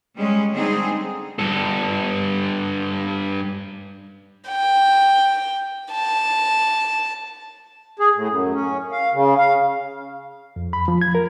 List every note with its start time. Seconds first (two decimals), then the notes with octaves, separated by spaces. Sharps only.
0.17 G3 G#3 C#4
0.53 D3 G3 G#3 C4 D#4 G#4
1.39 G2 A4
4.48 G5
5.92 A5
7.99 G#4
8.15 A2
8.28 F#2
8.53 C#4
8.92 F5
9.13 C#3
9.38 F5
10.56 F2
10.73 B5
10.88 F3
11.02 G#6
11.15 A#4